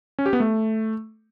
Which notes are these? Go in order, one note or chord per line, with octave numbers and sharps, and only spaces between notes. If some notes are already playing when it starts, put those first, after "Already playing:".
C#4
G4
B3
A3